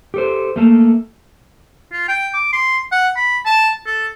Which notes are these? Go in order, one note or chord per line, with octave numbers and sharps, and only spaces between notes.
G4 A4 C5
A3 A#3 A4
F4
G5
D6
C6
F#5
B5
A5
A4